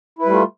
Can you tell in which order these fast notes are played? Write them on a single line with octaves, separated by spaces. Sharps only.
E4 B4 G3 A3 F4